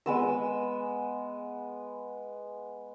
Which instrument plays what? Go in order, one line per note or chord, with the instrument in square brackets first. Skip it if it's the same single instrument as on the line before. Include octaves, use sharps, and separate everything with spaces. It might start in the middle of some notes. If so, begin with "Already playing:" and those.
[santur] G#3 B3 E6